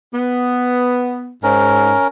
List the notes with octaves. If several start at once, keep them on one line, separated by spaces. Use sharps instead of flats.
B3
G#2 C#4 A#4